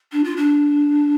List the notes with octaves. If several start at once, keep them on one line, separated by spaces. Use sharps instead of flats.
D4
F4
D4